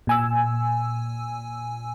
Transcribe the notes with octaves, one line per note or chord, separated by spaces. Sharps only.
A#2 G#5 E6